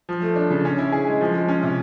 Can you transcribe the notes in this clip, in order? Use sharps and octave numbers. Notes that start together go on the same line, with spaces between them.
F3
A3
D4
C#3
C#4
E4
G#4
G#3
F3
G#3
C#4
C3